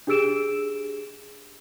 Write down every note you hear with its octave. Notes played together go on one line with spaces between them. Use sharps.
D4 G4 G#4 E6 D7 E7